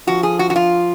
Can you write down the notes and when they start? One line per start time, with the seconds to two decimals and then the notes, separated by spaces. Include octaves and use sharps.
0.07 F3 F#4
0.23 G#4
0.39 F#4
0.50 F#4
0.56 F4